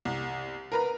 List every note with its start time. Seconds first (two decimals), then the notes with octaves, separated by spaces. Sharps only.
0.05 C2
0.72 A#4 B4 A#5